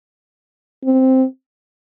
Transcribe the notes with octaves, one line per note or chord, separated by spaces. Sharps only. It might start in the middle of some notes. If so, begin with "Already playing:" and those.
C4